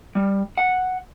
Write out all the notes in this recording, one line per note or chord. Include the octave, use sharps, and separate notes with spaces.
G3
F#5